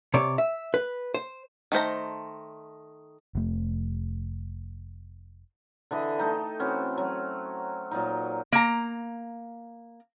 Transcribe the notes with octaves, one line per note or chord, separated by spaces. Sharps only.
C3 C#5 D5
E5
B4
C5
D#3 A3 C5 A#5
F1 A3
D3 E3 D#5 E5
A3 D#4 G5
E3 C4 C#4 F#4
F#3
A#2 F#3 D#4
A#3 A#5